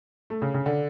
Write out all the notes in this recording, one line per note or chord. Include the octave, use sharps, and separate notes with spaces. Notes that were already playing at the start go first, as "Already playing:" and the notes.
A3
C#3
C#3
D3